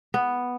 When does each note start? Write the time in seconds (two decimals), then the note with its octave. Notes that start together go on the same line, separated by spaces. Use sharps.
0.14 B3